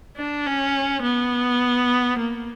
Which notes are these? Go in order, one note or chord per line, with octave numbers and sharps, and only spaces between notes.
D4
C#4
B3
A#3